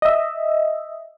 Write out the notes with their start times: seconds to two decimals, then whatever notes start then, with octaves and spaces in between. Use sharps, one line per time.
0.02 D#5 E5